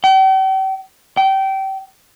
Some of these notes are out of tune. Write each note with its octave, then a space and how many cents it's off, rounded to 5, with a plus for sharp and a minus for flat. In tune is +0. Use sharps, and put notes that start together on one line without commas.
G5 -40
G5 -25